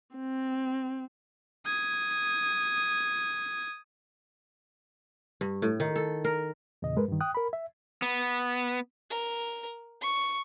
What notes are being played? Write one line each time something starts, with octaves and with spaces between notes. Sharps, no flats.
C4
D#6 G#6
G2
A2
D#3
A4
A#4
E2 A#2 C#3 D#5
G2 G#3 A#4 B4
G2 D#3
G5 D#6 F#6
A#4 B5
E5
B3
A#4
C#6